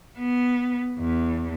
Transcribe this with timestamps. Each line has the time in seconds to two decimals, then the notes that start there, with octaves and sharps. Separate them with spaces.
0.18 B3
0.97 E2